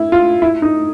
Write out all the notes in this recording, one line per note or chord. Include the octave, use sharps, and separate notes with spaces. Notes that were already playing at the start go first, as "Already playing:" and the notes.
Already playing: E4
F4
E4
D#4